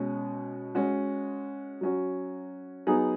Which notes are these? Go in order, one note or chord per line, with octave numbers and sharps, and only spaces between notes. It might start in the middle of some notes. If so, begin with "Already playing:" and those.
Already playing: B2 G#3 C#4
G#3 C#4 F#4
F#3 C#4 F#4
F#3 B3 D#4 G#4